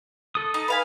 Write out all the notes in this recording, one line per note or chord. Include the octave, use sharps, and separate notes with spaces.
A4 D#6
D#4
B4 F5 G#5